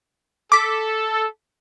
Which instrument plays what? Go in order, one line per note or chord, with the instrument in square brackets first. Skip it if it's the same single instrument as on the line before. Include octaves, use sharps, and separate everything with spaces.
[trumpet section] A4 [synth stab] D6 B6